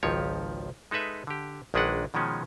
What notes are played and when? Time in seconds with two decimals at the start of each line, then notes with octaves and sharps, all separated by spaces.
0.03 G#1 C#2 D#3 F3 G4 C#5
0.91 G#3 D#4 A4 B4 E5
1.27 D3 G4
1.74 A#1 D#3 G#3 D4 B4 F#5
2.14 B2 D#3 F3 G#3 C#4